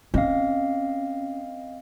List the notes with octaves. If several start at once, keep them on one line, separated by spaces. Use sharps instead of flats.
C4 C#4 D#5 F5